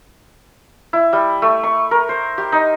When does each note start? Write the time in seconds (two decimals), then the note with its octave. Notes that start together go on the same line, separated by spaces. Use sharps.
0.93 E4
1.13 G3
1.42 A3
1.63 C#6
1.91 A#4
2.09 C5
2.38 G4
2.52 D#4